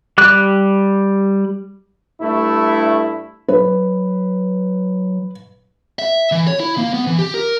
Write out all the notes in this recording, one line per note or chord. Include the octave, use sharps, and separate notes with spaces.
G3 D6 F#6
G2 A3 E4
F#3 B4
E5
E3
C#5
E4
A#3
B3
E3
G4
A#4